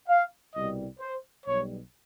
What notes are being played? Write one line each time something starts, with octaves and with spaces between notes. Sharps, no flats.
F5
C2 B2 G3 D#5
C5
B1 B2 G3 C#5